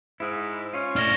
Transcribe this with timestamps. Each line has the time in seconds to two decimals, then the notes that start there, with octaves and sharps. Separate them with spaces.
0.20 G#2 E4
0.73 C#4 F4
0.96 A2 A3 D4 C#5 F6 A#6 E7